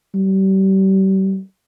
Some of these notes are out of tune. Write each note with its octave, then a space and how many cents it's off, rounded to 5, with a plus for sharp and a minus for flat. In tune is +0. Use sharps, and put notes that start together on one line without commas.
G3 -35